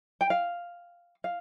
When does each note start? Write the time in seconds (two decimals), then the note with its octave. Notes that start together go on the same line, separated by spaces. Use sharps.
0.21 G5
0.30 F5
1.24 F5